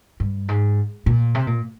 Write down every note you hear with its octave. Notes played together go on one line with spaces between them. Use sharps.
G2
G#2
A#2
C3
A#2